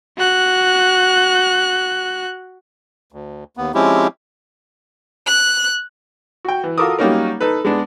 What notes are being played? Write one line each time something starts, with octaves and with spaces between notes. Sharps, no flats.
F#4 F#6
D2
D#2 B3
F3 G#3 C4 C#4 E4 G4
F#6
F#4 G5
E3
F4 F#4 A4 A#4 D6 D#6
F#3 G3 A#3 C#4 D#4 A#4
D#4 A4 B4
G#3 B3 D4